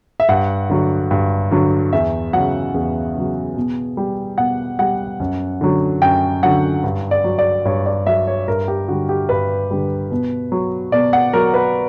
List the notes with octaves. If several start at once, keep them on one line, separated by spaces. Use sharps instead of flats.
E5
G2 F#5
D3 F#3
G2
D3 F#3
E2 E5
C#3 F#3 F#5
E2
C#3 F#3
B2
G3
B2 F#5
G3 F#5
F#2
D3 F#3
F#2 G5
D3 F#3 F#5
G2
D5
F#3
D5
G2 C#5
D5
F#3 E5
C#5
G2 A#4
G4
D3 G3 F#4
G4
G2 B4
D3 G3
B2
F#3
B2 D5
F#5
F#3 A#4
B4